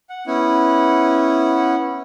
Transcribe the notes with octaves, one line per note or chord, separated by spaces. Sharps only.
F#5
B3 C#4 E4 F#5